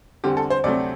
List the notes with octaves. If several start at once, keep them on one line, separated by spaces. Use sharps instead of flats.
E2 D3 G3 C4 G4
A4
C5
D2 C3 F#3 A3 C4 D5